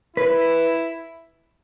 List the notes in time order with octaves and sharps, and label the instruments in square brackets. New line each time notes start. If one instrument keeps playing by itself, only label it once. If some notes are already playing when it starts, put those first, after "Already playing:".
[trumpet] E4 [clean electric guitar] B4